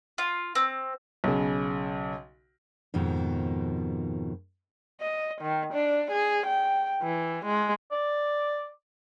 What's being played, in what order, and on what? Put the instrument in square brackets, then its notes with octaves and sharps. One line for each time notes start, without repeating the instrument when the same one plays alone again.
[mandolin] F4
C4
[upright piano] B1 C#3
[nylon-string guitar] F2 G#2 B2 D#3 F3
[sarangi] D#5
D#3
D4
G#4
G5
E3
G#3
[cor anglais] D5